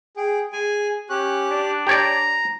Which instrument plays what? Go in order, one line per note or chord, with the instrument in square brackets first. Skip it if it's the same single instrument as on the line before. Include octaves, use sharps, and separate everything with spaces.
[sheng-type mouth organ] G#4 [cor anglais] G5
[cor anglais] G#4 [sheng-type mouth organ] G#5
[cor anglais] C#4 [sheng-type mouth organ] G4 F#6
[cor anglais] D4
[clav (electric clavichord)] G4 C#5 D5 [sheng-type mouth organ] A#5